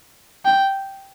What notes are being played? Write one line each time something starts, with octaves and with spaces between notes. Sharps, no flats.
G5